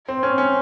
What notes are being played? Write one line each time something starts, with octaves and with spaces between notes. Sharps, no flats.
C4
C#4
C#4